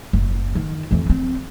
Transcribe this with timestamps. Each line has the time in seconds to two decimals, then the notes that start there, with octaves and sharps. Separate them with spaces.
0.13 F#1
0.55 D#3
0.91 F2 E3
1.10 C4